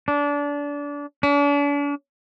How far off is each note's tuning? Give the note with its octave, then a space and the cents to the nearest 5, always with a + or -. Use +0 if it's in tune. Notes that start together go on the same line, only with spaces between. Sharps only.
D4 -25
D4 -40